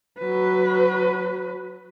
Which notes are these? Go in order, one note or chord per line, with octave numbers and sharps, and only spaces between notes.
F#3 B4